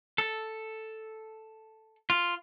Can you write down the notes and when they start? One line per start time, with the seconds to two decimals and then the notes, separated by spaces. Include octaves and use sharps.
0.18 A4
2.10 F4